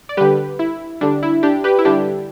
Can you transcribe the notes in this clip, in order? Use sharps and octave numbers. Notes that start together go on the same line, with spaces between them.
D5
D3 G3 G4 B4
E4
D3 G3 D4
E4
D4 G4
G4 B4
E4
D3 G3 D4 G4